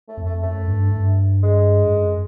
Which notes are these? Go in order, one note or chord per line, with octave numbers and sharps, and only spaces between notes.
A3
F2
A3
F#2 A3
G2
G2
G#3
G2
F#2